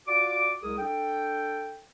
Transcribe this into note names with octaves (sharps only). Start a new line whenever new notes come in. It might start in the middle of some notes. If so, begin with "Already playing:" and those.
F4 F#4 D5 D6
C2 G#3 G#4 A#4 D#6
D4 A4 G5